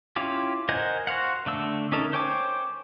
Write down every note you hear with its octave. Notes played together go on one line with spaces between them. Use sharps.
C#4 E4 F4 G4
A#4 C5 D#5 F#5 G#5
F#4 C5 F5 F#5
D3 A3 E6
C#4 D#4 A4 A#4
C5 C#5 G5 G#5 D6